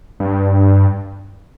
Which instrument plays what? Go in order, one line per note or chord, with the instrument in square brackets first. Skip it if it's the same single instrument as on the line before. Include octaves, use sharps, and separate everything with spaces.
[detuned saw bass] G2